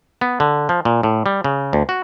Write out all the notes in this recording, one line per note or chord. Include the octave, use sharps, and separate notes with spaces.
B3
D3
F3
A#2
A2
G3
C#3
D2
F#4